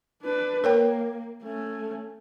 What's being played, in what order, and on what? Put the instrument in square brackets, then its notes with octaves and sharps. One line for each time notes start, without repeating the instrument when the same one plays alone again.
[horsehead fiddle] D4 B4
[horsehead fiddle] A#3 [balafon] A#4 C#5 G5
[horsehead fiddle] A3 C#4